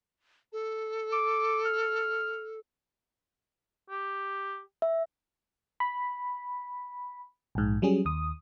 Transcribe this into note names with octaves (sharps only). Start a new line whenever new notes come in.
A4
D6
F6
G4
E5
B5
A#1 G#2
F#3 G3 C#4 G#4
D#2 D#6